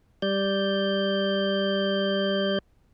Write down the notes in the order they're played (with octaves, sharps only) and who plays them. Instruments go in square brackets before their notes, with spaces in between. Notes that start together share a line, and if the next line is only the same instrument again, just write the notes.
[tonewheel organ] G3 D5 G6